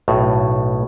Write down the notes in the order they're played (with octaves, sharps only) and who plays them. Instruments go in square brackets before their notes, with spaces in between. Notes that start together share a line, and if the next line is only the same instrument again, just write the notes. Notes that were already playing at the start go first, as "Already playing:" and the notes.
[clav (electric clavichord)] B1 A2